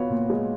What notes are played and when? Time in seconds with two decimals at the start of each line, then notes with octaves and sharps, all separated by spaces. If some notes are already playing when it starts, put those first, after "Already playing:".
Already playing: B3 F4 F#4 B4 C#5
0.10 A#2
0.30 G#3